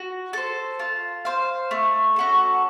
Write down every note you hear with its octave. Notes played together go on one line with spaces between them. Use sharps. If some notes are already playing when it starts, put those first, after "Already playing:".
Already playing: F#4
A4 C5
F4
C5 F5
A3
C#4 F#4 A4